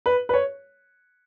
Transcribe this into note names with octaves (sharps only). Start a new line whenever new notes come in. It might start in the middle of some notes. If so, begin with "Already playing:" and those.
B4
B4
C#5